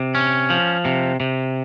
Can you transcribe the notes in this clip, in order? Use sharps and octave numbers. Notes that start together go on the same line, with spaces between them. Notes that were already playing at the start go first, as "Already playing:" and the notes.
Already playing: C3
C#4
F3
C3
C3